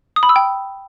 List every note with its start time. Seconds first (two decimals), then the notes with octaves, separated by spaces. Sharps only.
0.16 D#6
0.23 B5
0.29 E6
0.36 G5